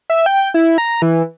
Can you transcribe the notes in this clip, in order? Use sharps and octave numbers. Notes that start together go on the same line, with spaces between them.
E5
G5
E4
A#5
E3